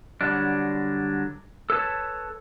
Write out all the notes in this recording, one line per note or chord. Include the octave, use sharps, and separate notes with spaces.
D3 F#3 G3 D4
A4 B4 C#5 A5